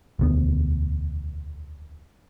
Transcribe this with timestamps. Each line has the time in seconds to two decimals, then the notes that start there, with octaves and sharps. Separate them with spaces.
0.19 E1 D2 B3